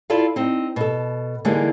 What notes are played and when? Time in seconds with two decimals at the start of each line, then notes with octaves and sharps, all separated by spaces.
0.10 E4 F4 A4 D5 F5
0.36 C4 D#4
0.76 B2 A4
1.45 D3 E3 G3 G#3 A#3 D#4